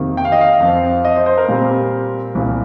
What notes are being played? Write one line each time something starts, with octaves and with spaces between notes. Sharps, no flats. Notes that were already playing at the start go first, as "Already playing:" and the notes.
Already playing: F2 C3 D#3 A#3
G5
F5
D#5
F5
F2 F3 C4
D#5
C5
C5
A#4
A#2 G3 C4
C2 A#2 A#3